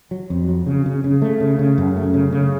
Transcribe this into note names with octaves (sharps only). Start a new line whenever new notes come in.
F#3
F2
F#3
C#3
C#3
C#3
A3
C#3
C#3
F#2
A3
C#3
C#3